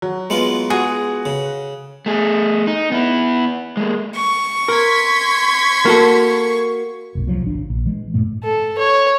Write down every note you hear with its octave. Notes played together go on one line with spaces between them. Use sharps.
F#3
G#3 B3 F4
F#4 G#4
C#3
A3 G#4
D#4
B3 E4
G#3 A#3
C#6
A#4 C6 G#6 B6
A#3 F#4 A4
F1 B1
C2 C3 F3 F#3
G#1 D4
A#1
E3 G#3
G2 A#2 A3
A4
C#5